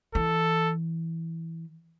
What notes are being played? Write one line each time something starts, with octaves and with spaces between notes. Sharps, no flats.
E3 A4